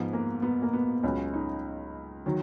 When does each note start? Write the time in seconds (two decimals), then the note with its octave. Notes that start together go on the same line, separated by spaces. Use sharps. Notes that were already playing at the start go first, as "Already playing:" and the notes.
Already playing: G#2 F3 B3
0.13 A#3
0.42 B3
0.62 A#3
0.73 B3
1.03 C#2 C#3 F#3 C#4
1.33 D#4
2.26 D#3 F#3